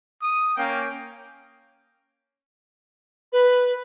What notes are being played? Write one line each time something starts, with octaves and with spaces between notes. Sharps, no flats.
D#6
A#3 C#4 G5
B4